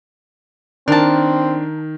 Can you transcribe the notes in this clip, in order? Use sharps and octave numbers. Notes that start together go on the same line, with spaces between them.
D#3 C4 D4 A#4 A5